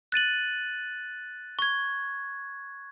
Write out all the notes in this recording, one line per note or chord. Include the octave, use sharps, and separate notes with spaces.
F#6 A6 D#7 F#7
C#6 G#6